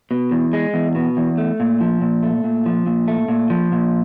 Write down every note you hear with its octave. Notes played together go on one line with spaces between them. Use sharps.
B2
E2
G#3
E2
B2
E2
A3
A#2
F3
A#2
A3
A#2
F3
A#2
A3
A#2
F3
A#2